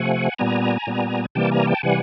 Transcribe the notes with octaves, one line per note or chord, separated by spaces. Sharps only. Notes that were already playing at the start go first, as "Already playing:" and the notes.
Already playing: C3 F3 A3 F#5 G#5
A#2 G3 B3 G#5 A#5
A#2 G3 B3
C3 E3 G3 A#3 G5 A5
G#5 A#5
G5 A5
C3 E3 G3 F#5 G#5